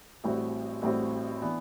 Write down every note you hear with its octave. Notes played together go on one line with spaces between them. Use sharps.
A1 A2 G3 C4 F#4
A1 A2 G3 C4 F#4
E3 B3 D4